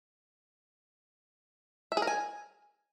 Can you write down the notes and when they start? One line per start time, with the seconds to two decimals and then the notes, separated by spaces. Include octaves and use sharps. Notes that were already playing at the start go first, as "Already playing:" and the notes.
1.92 E5
1.97 G#4
2.02 A#4
2.07 G#5